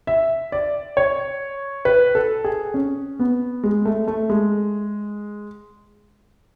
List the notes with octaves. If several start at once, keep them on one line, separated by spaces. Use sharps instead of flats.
E5
D5
C#5
B4
A4
G#4
C#4
B3
G#3
A3
A3
G#3